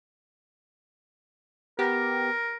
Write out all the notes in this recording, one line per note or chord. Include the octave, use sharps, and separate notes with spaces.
B3 G4 A#4